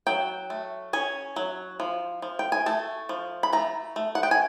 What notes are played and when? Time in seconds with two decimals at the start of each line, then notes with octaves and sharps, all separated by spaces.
0.07 F#3 G5
0.50 A3
0.93 C#4 G#5
1.36 F#3
1.80 F3
2.22 F3
2.39 G5
2.52 G#5
2.66 A3 A5
3.09 F3
3.43 B5
3.53 A3 A#5
3.96 A3
4.15 F#5
4.23 G5
4.31 G#5